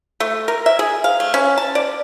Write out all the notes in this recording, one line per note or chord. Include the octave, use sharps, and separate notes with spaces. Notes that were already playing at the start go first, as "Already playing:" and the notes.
A3
A#4
E5
G#4
F5
A3
C#4
A5
D5